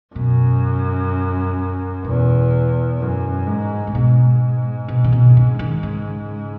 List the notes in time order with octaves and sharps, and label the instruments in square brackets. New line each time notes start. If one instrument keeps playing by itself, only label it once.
[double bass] F#2 [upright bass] B2
[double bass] E2 [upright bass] B2
[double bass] F#2
G#2
[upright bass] A2
[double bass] G#2 [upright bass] B2
[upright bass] B2
C#3
B2
C#3
D#3
C#3